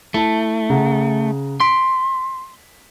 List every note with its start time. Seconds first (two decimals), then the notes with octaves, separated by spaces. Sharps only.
0.14 A3 E4 A5
0.70 C#3 F#5 A#5
1.60 C6 B6 D7